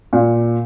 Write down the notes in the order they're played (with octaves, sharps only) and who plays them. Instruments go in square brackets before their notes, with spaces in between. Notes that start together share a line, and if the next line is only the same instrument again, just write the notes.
[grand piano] A#2